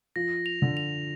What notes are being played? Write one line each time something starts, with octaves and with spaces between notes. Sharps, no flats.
F3 A#6
F7
D3
F7